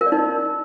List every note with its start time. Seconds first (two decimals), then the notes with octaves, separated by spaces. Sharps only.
0.01 A#4
0.06 D5
0.12 D#4